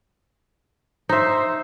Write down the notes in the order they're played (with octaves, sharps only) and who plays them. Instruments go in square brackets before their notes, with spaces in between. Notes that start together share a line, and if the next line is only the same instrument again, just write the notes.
[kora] D#4 E5 [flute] C5